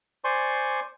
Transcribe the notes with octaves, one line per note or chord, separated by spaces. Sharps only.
C5 D5 G#5 C6 C#6